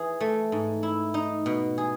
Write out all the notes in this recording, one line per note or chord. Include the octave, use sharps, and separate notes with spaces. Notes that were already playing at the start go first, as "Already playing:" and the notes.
Already playing: E3 G#4
A3
G#2
E4
D#4
B2
G#4